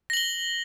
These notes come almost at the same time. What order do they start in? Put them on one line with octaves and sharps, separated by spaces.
A#6 F#7 G7